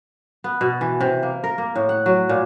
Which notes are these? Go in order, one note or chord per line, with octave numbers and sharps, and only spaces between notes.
B3
B2
E3
C3
A#3
A#4
A#3
A2
F#5
F#3
A#2